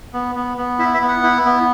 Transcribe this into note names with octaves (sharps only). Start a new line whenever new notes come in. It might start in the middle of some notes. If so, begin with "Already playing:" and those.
B3
B3
B3
E4 E5
E5
B3
F#5
E4
B3